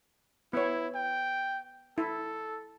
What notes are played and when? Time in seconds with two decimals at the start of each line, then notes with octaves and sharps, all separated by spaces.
0.53 B3 E4 C#5
0.95 G5
1.98 E4 A4